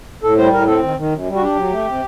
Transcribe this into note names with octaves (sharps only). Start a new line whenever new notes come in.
A2 A4
G3 C5
A2 A#4
C4 A4
D#3
D#3
F#2
G3
F#4
D4 G4
F#3
A3
C3